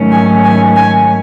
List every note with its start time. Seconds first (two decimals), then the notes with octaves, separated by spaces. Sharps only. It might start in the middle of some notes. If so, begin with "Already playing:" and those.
Already playing: G#2 D#3 F#3 A3 C#4
0.12 G#5
0.44 G#5
0.76 G#5